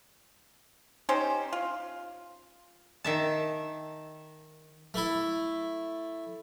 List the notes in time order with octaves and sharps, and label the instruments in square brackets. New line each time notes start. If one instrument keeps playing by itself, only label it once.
[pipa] C#4 D#4 G4 C5
F4
[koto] D#3 E5 A5
[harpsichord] A3 E4